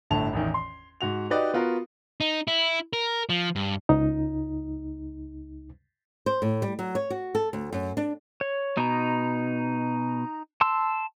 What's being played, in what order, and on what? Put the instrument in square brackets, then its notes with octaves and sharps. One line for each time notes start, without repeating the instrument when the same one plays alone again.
[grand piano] G1 A2 D3 A5 F7
A1 E2 D#3
C6
G#2 F#4 F7
D#4 F#4 G4 B4 D5 D#5
B3 F4 F#4 A#4
[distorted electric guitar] D#4
E4
A#4
F3
G2
[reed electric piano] C#2 D#4
[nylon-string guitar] C5
A2
G3
F#3
C#5
F#4
A4
D2
F#2
D4
[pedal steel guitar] C#5
[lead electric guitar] B2 [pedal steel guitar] D#4 A#5
[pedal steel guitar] A5 C6 E6